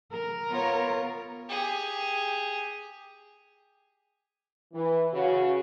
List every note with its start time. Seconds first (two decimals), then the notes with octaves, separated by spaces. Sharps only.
0.13 A#4
0.49 B3 F4 C#5
1.49 G4 G#4
4.73 E3
5.12 C#3 F#4